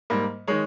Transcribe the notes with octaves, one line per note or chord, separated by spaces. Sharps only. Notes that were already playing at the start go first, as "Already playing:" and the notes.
G#2 G3 A#3
D#3 G#3 C#5